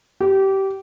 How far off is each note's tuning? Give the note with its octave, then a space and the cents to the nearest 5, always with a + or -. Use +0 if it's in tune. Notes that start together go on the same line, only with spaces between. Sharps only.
G4 -20